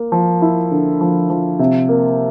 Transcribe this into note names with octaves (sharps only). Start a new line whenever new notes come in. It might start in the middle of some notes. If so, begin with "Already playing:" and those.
Already playing: A#3
F3
E4
D3
F3
F3
C3
A#3